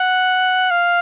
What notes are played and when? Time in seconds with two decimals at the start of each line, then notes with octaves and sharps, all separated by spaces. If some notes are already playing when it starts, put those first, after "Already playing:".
Already playing: F#5
0.71 F5